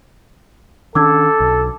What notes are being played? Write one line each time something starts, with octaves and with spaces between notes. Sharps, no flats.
D#3 C#4 D4 A4 D6 E6 G#6
B1